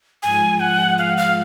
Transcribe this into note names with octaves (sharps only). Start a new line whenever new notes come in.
G#2 F3 G#3 G#5
F#5
F5
F5